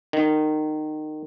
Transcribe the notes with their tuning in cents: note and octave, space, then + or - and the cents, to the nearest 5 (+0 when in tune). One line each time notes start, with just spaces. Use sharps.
D#3 -20